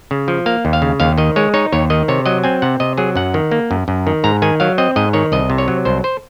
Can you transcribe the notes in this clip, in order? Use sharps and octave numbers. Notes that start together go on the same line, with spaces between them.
C#3
F3
A#3 F5
D#2
F5
C#3
D#2 F5
D#3 D#5
G#3 C#5
D#4 C#5
D#2 C#5
D#3 D#5
C3 C#5
F#3 D#5
C4 G#5
C3 F#5
C3 D#5
F#3 G#4
F#2 F#5
D#3
A#3
F#2
F#2
D#3
G#2 A#5
D#3 G#5
F#3 F5
C4 D#5
G#2 D#5
D#3 C#5
C2 D#5
C3
C#5
F#3
C2 C5
C5